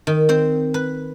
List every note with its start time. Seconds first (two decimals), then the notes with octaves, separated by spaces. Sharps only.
0.07 D#3
0.29 C4 C5
0.74 B4